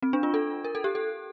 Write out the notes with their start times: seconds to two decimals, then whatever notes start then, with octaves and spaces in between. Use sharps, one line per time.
0.02 C4
0.13 D4
0.23 F4
0.34 A4
0.64 A#4
0.75 A4
0.84 G4
0.95 A4